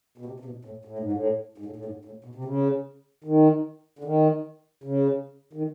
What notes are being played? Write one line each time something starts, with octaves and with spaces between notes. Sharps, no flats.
B2
C3
C3
B2
A2
A2
G#2
A2
G#2
A2
A2
G#2
A2
B2
C3
C#3
D#3
D3
D#3
C#3
D#3